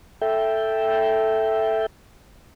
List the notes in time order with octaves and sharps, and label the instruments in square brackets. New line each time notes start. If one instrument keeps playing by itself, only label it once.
[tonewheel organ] A4 E5 G5